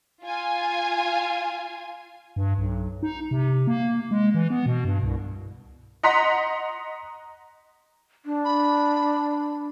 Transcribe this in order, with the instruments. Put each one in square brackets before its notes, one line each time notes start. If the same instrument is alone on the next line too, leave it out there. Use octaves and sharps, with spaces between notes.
[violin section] F4 G#5
[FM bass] G2
B1
D#4
C3
A#3
G#3
E3
B3
B2
G2
C2
[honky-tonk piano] D#5 F#5 A#5 C6 B6
[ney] D4
[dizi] B5